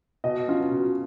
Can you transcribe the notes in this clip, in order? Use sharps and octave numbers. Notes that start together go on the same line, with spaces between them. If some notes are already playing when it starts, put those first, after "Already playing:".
B2 D#5
F#3 C#4 F4
B2